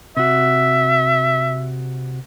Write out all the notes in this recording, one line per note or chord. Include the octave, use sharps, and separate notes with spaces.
C3 F#4 E5